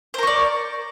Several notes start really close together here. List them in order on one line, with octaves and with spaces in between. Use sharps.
C5 A#4 C#6 D5